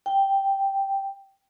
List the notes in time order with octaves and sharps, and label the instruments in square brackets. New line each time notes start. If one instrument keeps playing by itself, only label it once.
[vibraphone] G5